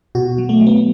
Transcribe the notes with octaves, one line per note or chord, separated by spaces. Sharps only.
B2 F#4
F#3
A3
F#3
B3